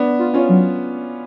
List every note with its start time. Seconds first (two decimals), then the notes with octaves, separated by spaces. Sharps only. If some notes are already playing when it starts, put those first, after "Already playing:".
Already playing: B3 D4
0.19 F4
0.34 C#4 F4
0.49 F#3